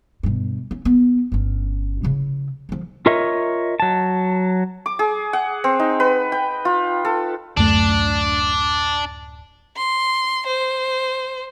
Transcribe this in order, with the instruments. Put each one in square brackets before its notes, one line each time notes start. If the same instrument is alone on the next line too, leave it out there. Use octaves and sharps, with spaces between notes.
[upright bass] G2 B2
C#4
B3
G1 C#4
C#3 E4
D3 F3
[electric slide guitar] F4 A#4 C#5 D#5 E5
F#3 A5
[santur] D6
G#4
F#5
C4
D#4
B4
G5
F4
A4
[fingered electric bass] D1 F#2 A3 [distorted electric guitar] D4
[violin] C6
C5